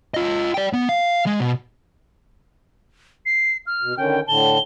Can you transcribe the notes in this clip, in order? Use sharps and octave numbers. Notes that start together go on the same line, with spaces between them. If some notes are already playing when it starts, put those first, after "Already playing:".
F4 D#5
D5 G5
B3
F5
G#3
B2
C7
F6
B2
D3 D#3 C#4 G5
A2 D3 A5 G7